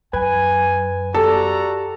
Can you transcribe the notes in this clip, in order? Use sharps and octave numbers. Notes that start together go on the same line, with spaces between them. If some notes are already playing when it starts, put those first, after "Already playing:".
F#2 B4 G#5 G#6
F#4 G4 A4 D5 A#5